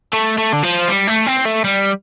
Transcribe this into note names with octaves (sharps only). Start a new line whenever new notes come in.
A3
A3
D3
F3
G3
A3
C4
A3
G3